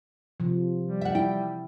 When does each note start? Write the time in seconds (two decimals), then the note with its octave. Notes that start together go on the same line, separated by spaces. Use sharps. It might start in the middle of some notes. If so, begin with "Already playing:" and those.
0.40 C3 F3
0.85 G3
1.01 E5 F#5
1.15 E4 G5